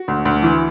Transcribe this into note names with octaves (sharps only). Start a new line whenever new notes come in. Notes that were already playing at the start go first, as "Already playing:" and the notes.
Already playing: F#4
D2
D2
E3